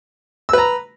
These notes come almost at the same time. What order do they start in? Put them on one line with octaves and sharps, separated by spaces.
E6 B4 A#5